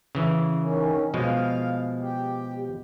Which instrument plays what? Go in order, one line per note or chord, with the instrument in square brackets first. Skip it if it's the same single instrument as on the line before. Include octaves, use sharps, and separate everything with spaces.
[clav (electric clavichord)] C#3 E3
[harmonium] D#3 C#4
[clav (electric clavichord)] B2 F3 G#3 [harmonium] F5
[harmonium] G4